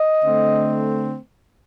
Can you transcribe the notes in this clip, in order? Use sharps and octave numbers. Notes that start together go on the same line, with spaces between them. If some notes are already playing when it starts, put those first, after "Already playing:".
Already playing: D#5
D3 A3 C4